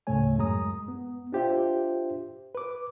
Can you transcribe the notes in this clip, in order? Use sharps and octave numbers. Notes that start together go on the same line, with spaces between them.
D2 A2 C#3 A3 C#5 G#5
F#2 G#3 A#5 D#6
B3
D4 F4 G4 C5 E5 G5
B4 D6